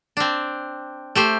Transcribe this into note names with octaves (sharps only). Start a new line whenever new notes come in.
C4 D4
A3 G4 C5